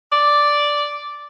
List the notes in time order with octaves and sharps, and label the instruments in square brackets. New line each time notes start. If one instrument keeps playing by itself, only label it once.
[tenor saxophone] D5